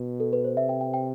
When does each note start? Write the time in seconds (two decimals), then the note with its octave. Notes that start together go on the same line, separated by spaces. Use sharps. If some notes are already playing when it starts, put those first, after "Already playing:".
Already playing: B2
0.20 A4
0.33 B4
0.45 C5
0.57 C3 E5
0.69 G5
0.81 G5
0.94 G5